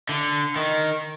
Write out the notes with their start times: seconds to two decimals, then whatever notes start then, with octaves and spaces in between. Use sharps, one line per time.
0.09 D3
0.56 D#3